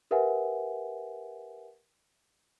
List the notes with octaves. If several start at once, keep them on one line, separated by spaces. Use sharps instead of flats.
G4 A#4 B4 E5 F#5 G#5